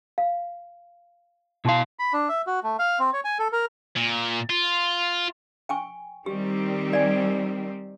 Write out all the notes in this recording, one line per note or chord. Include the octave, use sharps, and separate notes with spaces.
F5
B2 E4 F5 A5 C6
B5
D4
E5
F#4
A3
F5
C4
C#5
G#5
A4
A#4
A#2
F4
G5 G#5 C#6
D#3 G3 C4 G4
D5 G#5